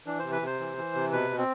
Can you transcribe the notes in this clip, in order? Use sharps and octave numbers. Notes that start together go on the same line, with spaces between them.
E3 D4
C3 C5
B4
C3 C5
E3
E3
C3
B2 B4
B2
C4